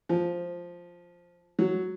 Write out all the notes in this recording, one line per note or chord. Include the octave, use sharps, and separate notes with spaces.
F3
F#3